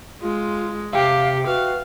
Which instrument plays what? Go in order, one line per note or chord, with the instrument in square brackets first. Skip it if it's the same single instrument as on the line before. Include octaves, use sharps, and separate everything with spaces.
[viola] G#3 [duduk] F4
[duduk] C3 [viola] G4 [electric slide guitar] E5 G5 [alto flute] F5
[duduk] F#4 [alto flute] B4 [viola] F5